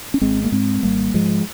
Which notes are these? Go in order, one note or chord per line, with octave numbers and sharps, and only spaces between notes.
C#4
G#1 G#3 C4
A#3
G#2 G#3 C4
G#1 G3 A#3
G#2 F3 G#3